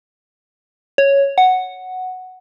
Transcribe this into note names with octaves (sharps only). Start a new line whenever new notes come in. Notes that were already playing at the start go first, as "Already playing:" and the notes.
C#5
F#5